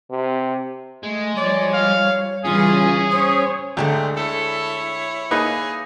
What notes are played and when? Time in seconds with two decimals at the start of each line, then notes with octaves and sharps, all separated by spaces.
0.11 C3
1.03 G#3 A3
1.37 F3 G3 C#5 D5
1.73 F5
2.44 C#3 E3 G3 C#4 F4 G#4
3.11 C5 C#5 D#6
3.77 D2 D3 G#3 A3 G4 A#5
4.17 E4 A4 C#5
5.31 A#3 D#4 G#4 B4